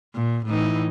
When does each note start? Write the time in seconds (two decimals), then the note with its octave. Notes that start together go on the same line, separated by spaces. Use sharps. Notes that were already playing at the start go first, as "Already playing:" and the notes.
0.15 A#2
0.46 A2 E3 D#4